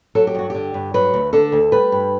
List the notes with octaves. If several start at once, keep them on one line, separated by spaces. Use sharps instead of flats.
F#3 A4
G4
G2 F#4
D3 G4
G2
F#3 B4
D2
D3 A4
D2
G3 B4
G2